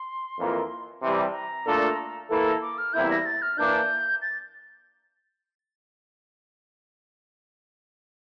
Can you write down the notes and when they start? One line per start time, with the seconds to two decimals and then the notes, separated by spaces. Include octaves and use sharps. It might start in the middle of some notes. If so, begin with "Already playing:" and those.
Already playing: C6
0.38 F2 E3 A#3 F4 A#4
1.02 C3 E3 G3 C6
1.13 A#5
1.23 A5
1.33 A#5
1.66 A#2 A3 D4 F4 A4
2.30 E3 A#3 E4 A4
2.46 A#5
2.62 D6
2.78 F6
2.93 E2 C3 G3 A#3 E4 G6
3.10 A#6
3.26 A6
3.42 F6
3.58 E3 A#3 D4 G6
4.22 A6